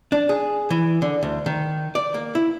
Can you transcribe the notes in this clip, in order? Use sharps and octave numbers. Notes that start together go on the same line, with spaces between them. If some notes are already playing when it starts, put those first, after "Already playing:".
D4
G#4
E3
D3
D2
D#3
D5
A#3
E4